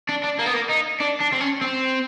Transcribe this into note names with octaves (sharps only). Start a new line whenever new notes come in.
D4
D4
A#3
B3
A#3
D#4
D4
D4
C4
C#4
C4